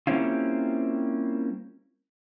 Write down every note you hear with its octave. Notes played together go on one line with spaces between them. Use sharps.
G3 A#3 C4 C#4 E4 F4